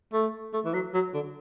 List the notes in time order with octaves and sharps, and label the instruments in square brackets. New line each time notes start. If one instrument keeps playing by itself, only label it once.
[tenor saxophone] A3
A3
E3
F#3
F#3
D3